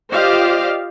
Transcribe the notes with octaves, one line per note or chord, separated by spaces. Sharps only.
F4 G4 C5 D5 D#5 F5